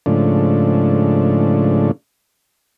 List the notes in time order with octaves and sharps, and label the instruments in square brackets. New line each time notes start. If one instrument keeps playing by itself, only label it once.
[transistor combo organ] G#2 C#3 F3 A3 D4